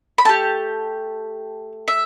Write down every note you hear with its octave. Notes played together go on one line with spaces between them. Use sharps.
B5
A3 G4 A5
E5